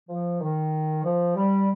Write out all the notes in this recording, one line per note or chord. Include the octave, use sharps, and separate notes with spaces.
F3
D#3
F3
G3